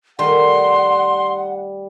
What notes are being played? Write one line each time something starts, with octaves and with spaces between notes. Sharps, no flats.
D#3 G3 A3 F#5 C6